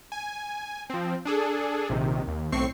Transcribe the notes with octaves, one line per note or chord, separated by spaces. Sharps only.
G#5
F3 C4
D4 G#4 A4
A#1 C3 D#3
D#2
B1 A2 C4 C#6 C7